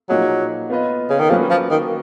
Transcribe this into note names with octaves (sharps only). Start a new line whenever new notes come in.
A#2 F3 F#3 A#3 D#4 G#4
B3 F4 B4 D#5
C#3
D#3
F3 F#3 A#3 C#4 F#4 B4
F3
D#3